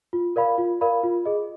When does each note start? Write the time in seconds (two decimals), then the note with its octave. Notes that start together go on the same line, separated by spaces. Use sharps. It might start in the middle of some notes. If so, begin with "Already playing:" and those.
0.13 F4
0.36 A#4 D5 F5 B5
0.58 F4
0.81 A#4 D5 F5 B5
1.03 F4
1.25 G#4 D#5